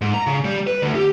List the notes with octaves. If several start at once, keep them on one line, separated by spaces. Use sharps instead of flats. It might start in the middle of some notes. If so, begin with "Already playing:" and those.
G#2
A#5
C#3
G3
B4
D2
G4